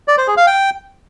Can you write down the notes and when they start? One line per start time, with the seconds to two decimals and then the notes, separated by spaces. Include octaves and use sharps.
0.08 D5
0.18 C5
0.27 G#4
0.37 F5
0.47 G5